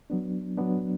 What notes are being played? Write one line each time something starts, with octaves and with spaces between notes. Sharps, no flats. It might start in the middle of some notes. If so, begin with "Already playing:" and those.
F#3 B3 D4
F#3 B3 D4